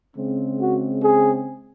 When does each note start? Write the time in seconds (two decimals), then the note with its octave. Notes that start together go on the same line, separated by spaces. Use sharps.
0.16 C#3 G#3 C4
0.59 F#4
1.03 G#4